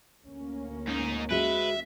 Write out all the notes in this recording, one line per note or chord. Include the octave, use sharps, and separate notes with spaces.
D2 A#3 C#4
G#2 D#4
G#3 F#4 G#4 B4 E5